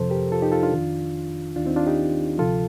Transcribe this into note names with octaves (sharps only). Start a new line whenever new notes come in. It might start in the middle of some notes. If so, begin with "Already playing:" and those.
Already playing: F2 C3 F3 A4 C5
G4 A#4
F4 A4
D#4 G4
F4 A4
D4 F4
F2 D#3
D#2 D#3 D4 F4
C4 D#4
D4 F4
D#4 G4
D2 C3 F3 F4 A4